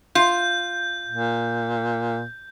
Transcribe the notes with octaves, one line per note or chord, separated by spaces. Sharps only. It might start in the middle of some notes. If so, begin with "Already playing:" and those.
F4 G6
A#2